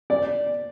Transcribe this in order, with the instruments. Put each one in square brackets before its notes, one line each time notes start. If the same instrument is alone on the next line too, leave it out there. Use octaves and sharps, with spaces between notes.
[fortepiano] D5